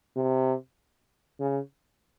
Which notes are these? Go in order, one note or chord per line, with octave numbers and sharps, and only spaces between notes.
C3
C#3